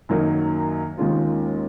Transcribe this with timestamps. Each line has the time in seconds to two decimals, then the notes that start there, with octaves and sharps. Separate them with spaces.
0.09 F#2 D#3 F#3 A#3 D#4
0.97 D#2 D#3 G#3 C#4 F4